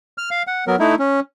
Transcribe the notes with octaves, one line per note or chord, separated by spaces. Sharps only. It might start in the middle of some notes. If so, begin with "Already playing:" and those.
F6
F5
F#5
F#3 B3 A#4
A3 D#4 E4
C#4